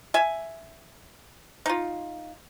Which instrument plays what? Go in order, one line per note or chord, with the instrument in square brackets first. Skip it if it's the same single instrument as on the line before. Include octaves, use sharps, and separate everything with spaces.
[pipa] E5 G#5
D#4 F4